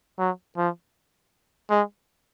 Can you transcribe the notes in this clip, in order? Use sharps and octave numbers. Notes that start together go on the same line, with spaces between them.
F#3
F3
G#3